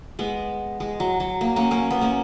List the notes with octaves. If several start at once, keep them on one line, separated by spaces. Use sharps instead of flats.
G#3 B3
G#3
F#3
F#3
A#3
A#3 C#4
A#3 C#4
B3
A#3 C#4